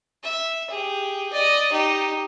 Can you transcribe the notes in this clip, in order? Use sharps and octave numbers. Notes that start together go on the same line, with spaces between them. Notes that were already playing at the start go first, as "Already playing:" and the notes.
E5
G4 G#4
D5 D#5
D#4 G4